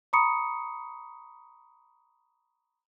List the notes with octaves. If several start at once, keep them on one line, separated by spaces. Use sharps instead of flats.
A#5 B5 C#6 D#6 C#7